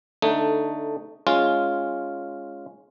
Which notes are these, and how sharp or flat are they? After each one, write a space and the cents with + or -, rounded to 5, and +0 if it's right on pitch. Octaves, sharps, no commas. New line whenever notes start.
D3 +0 A3 +10 D#4 +0
G#3 +0 C#4 +0 F4 +0